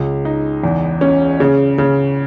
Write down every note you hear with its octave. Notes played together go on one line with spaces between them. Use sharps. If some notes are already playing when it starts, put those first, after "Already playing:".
Already playing: C#2
D#4
E2
C#4
C#3
C#3